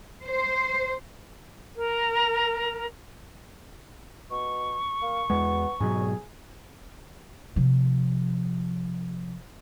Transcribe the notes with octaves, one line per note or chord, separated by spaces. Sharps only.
C5
A#4
B2 C#6
A#3
E2 G#3 B3
G#2 B2 F#3 G#4
C3 F3